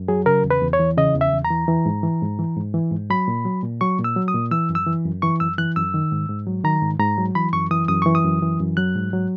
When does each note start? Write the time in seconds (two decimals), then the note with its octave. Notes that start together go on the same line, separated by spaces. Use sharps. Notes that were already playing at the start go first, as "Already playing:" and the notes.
Already playing: F#2
0.08 F#3 G#4
0.26 C#3 A#4
0.44 E2
0.51 B4
0.62 E2
0.73 C#5
0.79 E3
0.97 C#3 D#5
1.15 E2
1.21 E5
1.33 E2
1.45 A#5
1.50 E3
1.68 E3
1.86 G#2
2.03 E3
2.22 G#2
2.39 E3
2.56 G#2
2.74 E3
2.92 G#2
3.10 F#3 B5
3.28 A#2
3.45 F#3
3.63 A#2
3.81 F#3 C#6
3.99 A#2
4.04 E6
4.16 F#3
4.28 D#6
4.34 A#2
4.51 E3 E6
4.70 F#2
4.75 E6
4.87 E3
5.05 F#2
5.22 E3 C#6
5.40 F#2 E6
5.58 E3 F#6
5.76 F#2 E6
5.94 D#3
6.12 G#2
6.29 G#2
6.47 F#3
6.64 D#3 A#5
6.82 G#2
7.00 G#2 A#5
7.18 F#3
7.35 E3 B5
7.53 F#2 C#6
7.71 E3 D#6
7.88 F#2 D#6
8.02 E3 C#6
8.15 D#6
8.24 F#2
8.42 E3
8.60 F#2
8.77 F#3 F#6
8.95 G#2
9.13 F#3